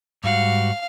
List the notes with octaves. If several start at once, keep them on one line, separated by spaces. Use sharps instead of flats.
G#2 G3 F#4 F5